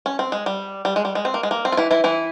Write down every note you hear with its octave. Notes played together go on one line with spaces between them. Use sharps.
C#4
C4
G#3
G3
G3
G#3
G3
G#3
C4
A#3
G#3
A#3
C4
F4
E3 E4
E3 E4
E3 E4